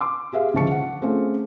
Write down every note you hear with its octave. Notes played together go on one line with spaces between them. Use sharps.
C6 D6
G4 G#4 E5 F5
C#2 D3 F3 A5 C#6 C#7
F#5
A3 C4 C#4 F4 G#4